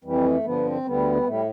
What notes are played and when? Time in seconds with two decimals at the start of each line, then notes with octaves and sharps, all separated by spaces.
0.04 F2 E3 G3
0.25 A3
0.44 G2 D3 F3 B3
0.65 C4
0.85 D2 D3 G3 B3
1.16 G3
1.26 A2 G3 A3